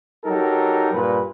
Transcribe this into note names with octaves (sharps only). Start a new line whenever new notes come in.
F#3 D#4 G4 A4 A#4
G2 A#2 B4